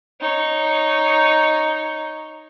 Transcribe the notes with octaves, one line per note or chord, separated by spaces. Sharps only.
D#4 C#5